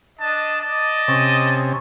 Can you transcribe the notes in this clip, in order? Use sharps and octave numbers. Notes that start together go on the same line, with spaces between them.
D4 D#5 A5
D5 D#5 A5
C3 C#4